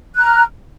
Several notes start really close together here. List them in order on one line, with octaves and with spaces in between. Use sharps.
F#6 A#5 F6